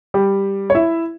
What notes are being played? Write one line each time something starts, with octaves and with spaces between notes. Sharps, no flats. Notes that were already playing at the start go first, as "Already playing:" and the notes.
G3 G4
C#5
E4 E5